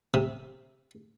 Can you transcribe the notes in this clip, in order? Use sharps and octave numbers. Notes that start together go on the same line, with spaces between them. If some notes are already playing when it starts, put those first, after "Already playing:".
C3